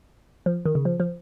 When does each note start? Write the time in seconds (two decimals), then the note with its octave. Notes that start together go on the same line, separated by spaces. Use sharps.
0.46 F3
0.66 D#3
0.75 C#3
0.85 F3
1.00 F3